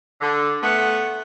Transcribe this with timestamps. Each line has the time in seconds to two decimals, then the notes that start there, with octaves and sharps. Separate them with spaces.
0.21 D3
0.62 A3 B3